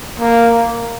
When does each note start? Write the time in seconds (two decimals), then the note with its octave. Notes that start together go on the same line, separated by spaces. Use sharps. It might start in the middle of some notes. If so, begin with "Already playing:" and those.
0.20 A#3